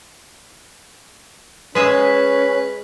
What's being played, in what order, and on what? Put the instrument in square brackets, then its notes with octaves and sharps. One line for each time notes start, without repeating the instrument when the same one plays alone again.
[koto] G#3 G#4 E5 [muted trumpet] C#4 [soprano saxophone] B4